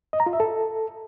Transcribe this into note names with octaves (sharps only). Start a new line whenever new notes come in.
D#5
A#5
F4
E5
A4